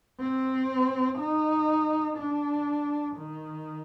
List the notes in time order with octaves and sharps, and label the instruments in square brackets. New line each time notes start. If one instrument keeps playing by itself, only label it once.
[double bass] C4
D#4
D4
D#3